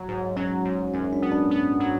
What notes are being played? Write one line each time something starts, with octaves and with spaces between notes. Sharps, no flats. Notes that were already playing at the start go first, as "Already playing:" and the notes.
Already playing: F#3
G#2
F#3 C#4
G#2
F#2 C#4
D4
B3
D4
B3
F#3